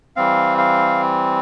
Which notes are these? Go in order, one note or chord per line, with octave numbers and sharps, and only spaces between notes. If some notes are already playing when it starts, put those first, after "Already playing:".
E3 G3 C4 F5
F5